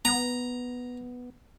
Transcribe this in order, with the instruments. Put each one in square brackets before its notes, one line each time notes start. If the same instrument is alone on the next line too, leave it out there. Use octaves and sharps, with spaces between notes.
[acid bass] B3 [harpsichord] A#5